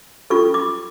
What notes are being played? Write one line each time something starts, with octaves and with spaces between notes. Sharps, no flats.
C#4 F4 A4 C#6
D6